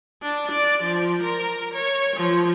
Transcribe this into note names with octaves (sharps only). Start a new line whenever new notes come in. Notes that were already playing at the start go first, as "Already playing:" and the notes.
D4
D5
F3
A#4
C#5
F3